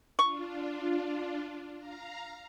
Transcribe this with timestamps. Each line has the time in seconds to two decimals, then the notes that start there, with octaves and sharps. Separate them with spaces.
0.19 D4 F4 C#6
1.78 F5 A#5